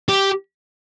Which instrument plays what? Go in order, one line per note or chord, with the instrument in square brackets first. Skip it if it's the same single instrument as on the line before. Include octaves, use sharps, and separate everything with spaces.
[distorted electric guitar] G4